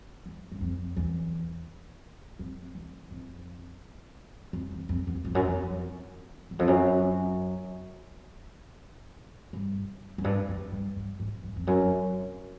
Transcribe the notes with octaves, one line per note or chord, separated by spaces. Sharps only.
E2
F#2
F2
E2
F2
E2
F2
F2
E2
F2
E2
F2
F#2
F2
E2
F2
F#2
G2
F#2
G2
F#2
G2
G2
G#2
G2
F2
F#2